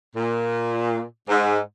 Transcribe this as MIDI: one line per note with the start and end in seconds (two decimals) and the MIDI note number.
0.16 1.01 46
1.29 1.59 44